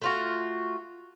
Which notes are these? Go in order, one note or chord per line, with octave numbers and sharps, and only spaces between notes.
A3 F4 F#4